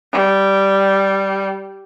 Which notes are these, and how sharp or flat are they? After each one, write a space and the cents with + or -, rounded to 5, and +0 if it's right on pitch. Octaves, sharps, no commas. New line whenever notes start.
G3 -10